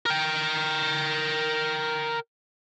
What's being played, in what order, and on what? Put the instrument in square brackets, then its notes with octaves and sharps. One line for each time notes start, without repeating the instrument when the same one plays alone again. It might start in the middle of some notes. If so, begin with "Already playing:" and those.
[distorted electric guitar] A#4 G5